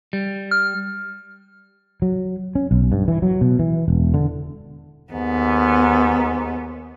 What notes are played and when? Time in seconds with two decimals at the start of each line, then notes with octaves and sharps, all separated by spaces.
0.13 G3
0.51 F6
2.02 F#3
2.55 C#4
2.71 B1
2.92 G2
3.08 E3
3.22 F#3
3.41 B2
3.59 E3
3.88 E1
4.14 D3
5.13 D#2 G#2 B3